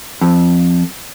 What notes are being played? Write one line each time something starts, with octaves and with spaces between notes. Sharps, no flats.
F2